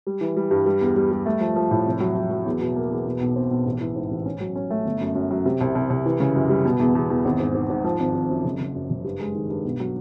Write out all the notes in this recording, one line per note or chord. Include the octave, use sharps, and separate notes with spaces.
G3
E3
G3
G2
G3
E2
G3
G3
A3
F3
F3
A2
F1
F#3
F#3
F#3
E2
B2
A#3
E2
B2
B1
C4
B1
A1
E3
G#2
A1
C#4
F#3
C#4
A3
G1
F#2
F#2
F#3
C3
C2
C2
C2
E3
C#3
F#2
G3
B2
E2
E2
E2
G#1
G#2
G#2
G#2
F3
G#1
G#1
F#2
F#1
F#1
F#2
F#1
G2
G#3
D#3
G2
B1
F#3